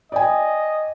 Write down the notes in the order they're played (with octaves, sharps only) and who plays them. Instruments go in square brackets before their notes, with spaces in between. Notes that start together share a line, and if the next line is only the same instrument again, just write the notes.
[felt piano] D5 G5 G#5 [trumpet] D#5